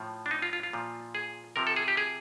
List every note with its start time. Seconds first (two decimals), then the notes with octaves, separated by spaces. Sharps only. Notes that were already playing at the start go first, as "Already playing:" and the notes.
Already playing: A2 F3
0.26 D4
0.31 D#4
0.42 F4
0.53 F4
0.63 F4
0.73 A#2 F3
1.15 G#4
1.56 C3 F3 A#4
1.67 A4
1.76 G#4
1.88 G4
1.97 G#4